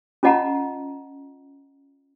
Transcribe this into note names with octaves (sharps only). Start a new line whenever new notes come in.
C#4 F4 D#5 F#5 A5 A#5